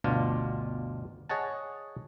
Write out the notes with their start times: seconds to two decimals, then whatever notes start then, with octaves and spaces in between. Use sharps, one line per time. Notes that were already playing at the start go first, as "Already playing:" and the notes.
0.04 G1 D2 B2 D4 F4
1.29 G#4 C#5 D#5 F#5 A5